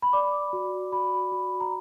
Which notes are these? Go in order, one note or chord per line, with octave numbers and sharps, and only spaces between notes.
B5
D5 D6
F#4
F#4 B5
F#4
A#5